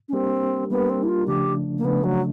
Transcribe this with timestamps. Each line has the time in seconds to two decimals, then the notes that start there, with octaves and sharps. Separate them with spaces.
0.09 C#4
0.13 G3 A#3 C4 D4 G4 A#4
0.70 G3 A#3 B3 D4 G4 A#4
0.89 C4
1.03 E4
1.08 F4
1.27 C#3 F3 A3 D4 G4
1.78 A#3
1.85 C#3 F3 A3 B3 D4
2.04 F#3